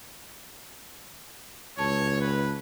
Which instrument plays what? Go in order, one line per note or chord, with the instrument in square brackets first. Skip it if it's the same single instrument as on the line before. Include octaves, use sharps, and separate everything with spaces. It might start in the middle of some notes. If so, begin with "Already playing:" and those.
[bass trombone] C#2 [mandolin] A4 [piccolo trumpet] C#5
[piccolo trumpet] B4